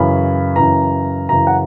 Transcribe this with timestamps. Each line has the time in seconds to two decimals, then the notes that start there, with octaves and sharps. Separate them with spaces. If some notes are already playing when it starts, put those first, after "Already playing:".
Already playing: F#2 C#3 E3 B5
0.56 F#2 C#3 E3 A#5
1.29 F#2 C#3 E3 A#5
1.47 F#5